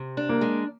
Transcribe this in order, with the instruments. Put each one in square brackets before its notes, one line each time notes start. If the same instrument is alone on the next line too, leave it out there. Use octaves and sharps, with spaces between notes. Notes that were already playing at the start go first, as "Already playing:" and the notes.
Already playing: [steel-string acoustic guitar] C3
D4
[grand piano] A#3
[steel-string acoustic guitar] G#3